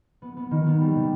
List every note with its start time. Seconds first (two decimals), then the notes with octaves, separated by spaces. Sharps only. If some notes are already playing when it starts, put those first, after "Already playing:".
0.22 B3
0.37 B3
0.51 D#3
0.66 B3
0.81 G3
0.96 C3